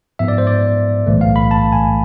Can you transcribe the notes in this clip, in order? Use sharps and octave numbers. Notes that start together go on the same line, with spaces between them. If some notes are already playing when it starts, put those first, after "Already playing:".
G#2 F3 B3 E5
D5
C5
D5
B1 A2 E3 A3
F5
B5
A5
G#5